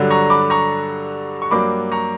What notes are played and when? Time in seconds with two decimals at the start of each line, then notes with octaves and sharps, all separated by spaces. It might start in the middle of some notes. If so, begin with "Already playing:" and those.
Already playing: G2 D3 F#3
0.11 A#5 C#6
0.30 B5 D6
0.50 A#5 C#6
1.42 C#6
1.51 G2 F#3 A#3 D4 B5 D6
1.92 A#5 C#6